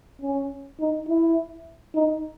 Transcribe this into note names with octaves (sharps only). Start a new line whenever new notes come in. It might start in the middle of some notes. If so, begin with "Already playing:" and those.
C#4
D#4
E4
D#4